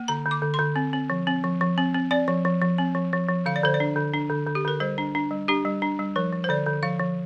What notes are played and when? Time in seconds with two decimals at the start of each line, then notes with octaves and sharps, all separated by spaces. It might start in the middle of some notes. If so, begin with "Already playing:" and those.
Already playing: A#3
0.08 D3 A#5
0.26 D3
0.31 D6
0.42 D3
0.54 C6
0.59 D3
0.76 C4
0.93 C4
1.10 F3
1.27 C4
1.44 F3
1.61 F3
1.78 C4
1.95 C4
2.11 C4 D5
2.28 F3
2.45 F3
2.62 F3
2.78 C4
2.95 F3
3.13 F3
3.28 F3
3.46 D3 F5
3.56 D5
3.63 D3 C5
3.74 D5
3.80 D4
3.96 D3
4.14 D4
4.30 D3
4.47 D3
4.55 G4
4.65 D3 A#4
4.80 G3 C5
4.98 D4
5.15 D4
5.31 G3
5.48 D4 G4
5.65 G3
5.82 D4
5.99 G3
6.16 F3 A#4
6.33 F3
6.44 C5
6.49 D3 D5
6.66 D3
6.83 F3 F5
6.99 F3